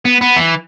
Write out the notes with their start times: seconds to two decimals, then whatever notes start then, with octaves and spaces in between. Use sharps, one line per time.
0.05 B3
0.21 B3
0.37 E3